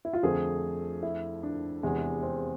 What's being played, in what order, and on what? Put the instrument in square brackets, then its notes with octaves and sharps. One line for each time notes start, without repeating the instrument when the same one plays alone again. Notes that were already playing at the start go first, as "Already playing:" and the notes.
[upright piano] E4
F4
[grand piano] F2 D3 A3 C4 [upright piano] G#4
[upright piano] E4
D4
[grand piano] E2 C3 G#3 B3 E4
[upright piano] C4